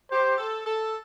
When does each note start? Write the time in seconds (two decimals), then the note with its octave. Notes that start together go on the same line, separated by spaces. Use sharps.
0.11 G4 C5
0.38 A4
0.66 A4